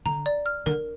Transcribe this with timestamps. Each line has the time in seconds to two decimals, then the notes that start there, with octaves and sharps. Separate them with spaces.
0.06 D3 A#5
0.26 D5
0.46 F6
0.66 D3 A#4